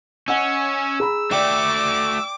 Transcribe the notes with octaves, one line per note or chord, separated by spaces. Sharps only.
C#4 D#5 F#5 E6
G#4 A#5 B5
A3 F#4 D5 G5 D6